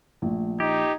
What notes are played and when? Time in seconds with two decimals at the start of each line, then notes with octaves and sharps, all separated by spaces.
0.22 A#1 A3
0.60 D#4 G4 G#6